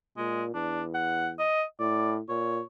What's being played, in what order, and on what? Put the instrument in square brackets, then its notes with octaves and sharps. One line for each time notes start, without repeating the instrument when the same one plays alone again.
[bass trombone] A#2 [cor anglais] G#3
[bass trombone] E2 [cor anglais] D4
[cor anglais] F#5
D#5
[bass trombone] A2 [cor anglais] D5
[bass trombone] A#2 [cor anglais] C#5